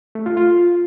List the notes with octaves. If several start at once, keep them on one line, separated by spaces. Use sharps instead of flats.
A3
F4
F4